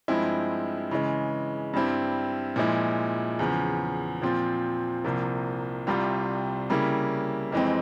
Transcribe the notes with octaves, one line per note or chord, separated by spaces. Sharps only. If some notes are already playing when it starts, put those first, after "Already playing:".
G2 F3 G#3 C4 E4
C#3 E3 G#3
G2 G3 C4 E4
A#2 F3 G#3 E4
E2 C#3 F3
A#2 F3 C4 F4
C2 C3 F3 A#3
C2 C3 G3 C4 F4
C#3 G3 A#3 E4
F2 E3 G#3 C4